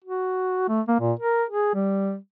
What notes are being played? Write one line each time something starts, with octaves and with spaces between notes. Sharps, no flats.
F#4
A3
A#3
A#2
A#4
G#4
G3